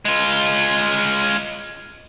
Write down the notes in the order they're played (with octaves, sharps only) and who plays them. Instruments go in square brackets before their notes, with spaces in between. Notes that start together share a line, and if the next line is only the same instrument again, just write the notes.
[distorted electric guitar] G#3 F4